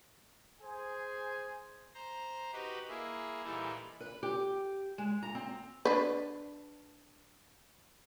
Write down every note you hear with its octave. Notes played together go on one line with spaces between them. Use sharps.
G#4 C5 G#5
C5 A#5
D#4 F#4 G4 B4
A#3 E4 G#4
A#2 E3 G3 D#4 E4 A4
B4
G4
G#3
A#5
C4
D4 B4